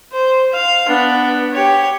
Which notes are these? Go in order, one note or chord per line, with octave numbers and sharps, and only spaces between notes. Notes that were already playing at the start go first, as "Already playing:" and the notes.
C5
F5
B3 D4
G4 C#5